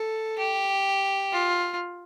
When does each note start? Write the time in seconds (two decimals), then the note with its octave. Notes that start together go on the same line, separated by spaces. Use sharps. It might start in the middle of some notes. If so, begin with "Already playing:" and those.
Already playing: A4
0.38 G4
1.33 F4